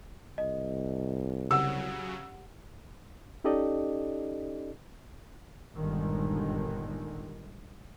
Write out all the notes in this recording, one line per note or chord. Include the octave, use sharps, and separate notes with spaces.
C2 D#5
C#3 F#3 G4 F#5 E6
C#4 D#4 G4 A4 D5 D#5
G1 A#2 D3 D#3 G#3